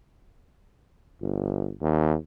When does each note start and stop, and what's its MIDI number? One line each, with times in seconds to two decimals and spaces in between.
1.22 1.72 31
1.81 2.17 39